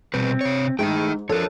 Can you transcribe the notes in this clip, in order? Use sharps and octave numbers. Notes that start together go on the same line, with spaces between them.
B2 G3 C4 B4
C3 C#5
G#2 A3 D#4 E4 A4 G5
F3 D4 A4 A#4 C#5